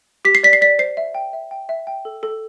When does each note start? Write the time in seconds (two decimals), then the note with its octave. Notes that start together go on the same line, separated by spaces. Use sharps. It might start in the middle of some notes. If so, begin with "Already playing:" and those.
0.25 G4 B6
0.35 C7
0.43 D5 B6
0.53 C7
0.62 D5 B6
0.79 C5 C7
0.97 E5
1.15 G5
1.33 E5
1.51 G5
1.69 E5
1.87 G5
2.05 A4
2.23 A4